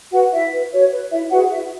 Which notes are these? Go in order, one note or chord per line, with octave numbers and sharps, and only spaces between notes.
F#4 B4 F#5
E4 E5
B4
F#4 C#5
B4
E4 E5
F#4 G#4 B4 F#5
E4 E5